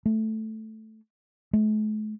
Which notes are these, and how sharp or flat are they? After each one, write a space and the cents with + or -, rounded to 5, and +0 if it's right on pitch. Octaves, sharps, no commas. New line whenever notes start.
A3 -5
A3 -45